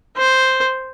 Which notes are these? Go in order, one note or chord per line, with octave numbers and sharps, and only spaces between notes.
C5